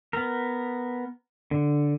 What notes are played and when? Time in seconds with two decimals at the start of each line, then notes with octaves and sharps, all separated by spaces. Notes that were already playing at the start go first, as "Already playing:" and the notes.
0.13 B3 A#4
1.51 D3